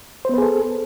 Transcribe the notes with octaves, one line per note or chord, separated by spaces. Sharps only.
B3 G#4 A4 B4 C5